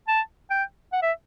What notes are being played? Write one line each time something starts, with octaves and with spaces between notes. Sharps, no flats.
A5
G5
F#5
E5